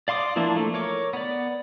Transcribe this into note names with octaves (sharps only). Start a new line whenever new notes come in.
D5 F5 C6 D6 D#6
E3 F3 A#3 D4 E4
A3
A#4 C#5 D6
B3 D5